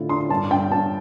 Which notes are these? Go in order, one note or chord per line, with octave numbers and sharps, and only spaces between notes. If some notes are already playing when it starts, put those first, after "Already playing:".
Already playing: A2 D3 F4
D4 C6
G2 A5
G2 G5
G2 A5